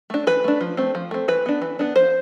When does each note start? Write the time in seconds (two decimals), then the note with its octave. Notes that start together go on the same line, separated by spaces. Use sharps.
0.10 A3 D4
0.27 E3 B4
0.44 A3 D4
0.61 F3
0.77 A3 C4
0.95 F3
1.11 A3 C4
1.28 E3 B4
1.46 B3 D4
1.62 E3
1.79 B3 D4
1.96 F3 C5